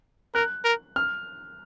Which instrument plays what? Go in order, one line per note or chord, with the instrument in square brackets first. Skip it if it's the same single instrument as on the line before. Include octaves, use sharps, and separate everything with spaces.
[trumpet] A#4 [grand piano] F#6
[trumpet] A#4
[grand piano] F6